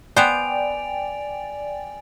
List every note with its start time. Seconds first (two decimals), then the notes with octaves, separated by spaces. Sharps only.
0.17 B3 C5 D5 G5 G#5 D7 F7